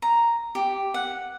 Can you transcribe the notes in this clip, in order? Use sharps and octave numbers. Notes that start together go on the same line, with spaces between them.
A#5
G4
F#5